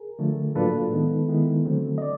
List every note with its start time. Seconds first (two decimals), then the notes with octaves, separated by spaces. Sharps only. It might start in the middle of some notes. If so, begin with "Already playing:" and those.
Already playing: G#4 A#4
0.19 D3 F3 A3
0.55 A2 F#3 A#3 D4 F4 A4 B4
0.92 D#3 G#3 B3 D#4
1.28 D#3 G#3 B3 E4
1.65 D3 F#3 A3 C4
1.98 D#5
2.02 D5